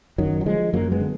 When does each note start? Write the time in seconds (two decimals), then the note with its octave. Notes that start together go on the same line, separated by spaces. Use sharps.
0.18 F#2 D#3 F#3
0.41 F#3
0.46 D3 F3 G#3
0.73 F#2 F#3 A#3
0.92 G#3 B3
1.01 D3